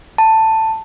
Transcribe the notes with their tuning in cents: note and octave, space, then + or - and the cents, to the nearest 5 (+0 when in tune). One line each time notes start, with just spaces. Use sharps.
A5 +10